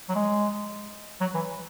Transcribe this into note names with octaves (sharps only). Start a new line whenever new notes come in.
F#3
G#3
F#3
E3